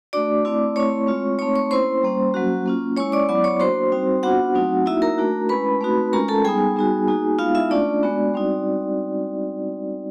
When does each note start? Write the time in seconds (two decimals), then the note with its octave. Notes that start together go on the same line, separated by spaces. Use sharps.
0.13 A3 D4 F#4 D5 D6
0.45 A3 C4 E4
0.76 A3 C4 E4 C#5 C#6
1.07 G#3 C4 F4
1.39 A3 C4 D#4 C#5 C#6
1.56 C#5 C#6
1.71 A#3 C#4 E4 C5 C6
2.03 G3 A#3 C#4
2.34 F#3 A#3 C#4 F#4
2.66 A#3 C#4 F4
2.97 G#3 C#4 E4 C#5 C#6
3.12 D5 D6
3.29 F#3 B3 E4 D5 D6
3.44 C#5 C#6
3.60 A#3 D4 F#4 C5 C6
3.92 G3 C4 D#4 F#4
4.23 B3 D4 F4 F#4 F#5
4.54 F#3 A3 C4 D#4
4.86 A#3 D#4 E4 F#4 E5
5.02 A#4 A#5
5.18 A3 D4 F#4
5.49 G#3 C#4 E4 B4 B5
5.81 A3 C4 D#4 F#4
6.13 G#3 C#4 F4 A#4 A#5
6.28 A4 A5
6.45 G3 B3 D#4 G#4 G#5
6.76 G3 B3 D#4 F#4
7.08 A#3 D#4 F#4
7.39 G#3 B3 D#4 F4 F5
7.55 E4 E5
7.70 A3 C#4 D4 F4 D5
8.03 G#3 B3 D4 F#4
8.34 G3 C4 D#4 F#4